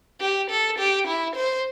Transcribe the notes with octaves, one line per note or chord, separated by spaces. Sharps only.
G4
A4
G4
E4
C5